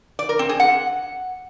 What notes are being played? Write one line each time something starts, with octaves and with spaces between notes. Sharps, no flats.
D5
A#4
C4
G#4
F#5